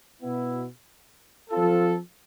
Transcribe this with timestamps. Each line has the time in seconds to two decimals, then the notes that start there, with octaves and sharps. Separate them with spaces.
0.21 B2 B3 E4
1.50 F3 C4 F4 A4